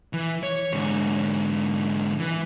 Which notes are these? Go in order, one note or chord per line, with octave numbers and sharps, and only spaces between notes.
E3
C#5
G#2 D3
E3